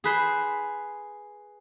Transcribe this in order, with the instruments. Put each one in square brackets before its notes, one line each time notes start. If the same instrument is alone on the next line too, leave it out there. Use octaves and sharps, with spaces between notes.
[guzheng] G#4 B4 C5